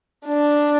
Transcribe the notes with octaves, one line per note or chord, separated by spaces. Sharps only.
D4